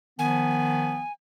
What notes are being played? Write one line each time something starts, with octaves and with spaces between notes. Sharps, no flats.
D#3 F3 B3 G#5